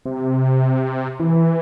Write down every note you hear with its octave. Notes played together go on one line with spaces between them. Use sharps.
C3
E3